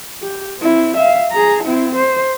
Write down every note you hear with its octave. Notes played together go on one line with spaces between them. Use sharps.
G4
C4 E4
E5 F5
G#4 A#5
C4 E4
C5